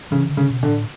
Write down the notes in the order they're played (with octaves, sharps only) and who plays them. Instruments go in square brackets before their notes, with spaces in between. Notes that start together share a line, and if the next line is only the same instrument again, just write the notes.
[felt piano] C#3 [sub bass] E3
[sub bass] D3
[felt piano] C#3
[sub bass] B2
[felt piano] D3
[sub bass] A2